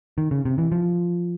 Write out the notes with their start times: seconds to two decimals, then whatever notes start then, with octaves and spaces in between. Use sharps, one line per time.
0.18 D#3
0.31 C#3
0.45 C3
0.58 E3
0.72 F3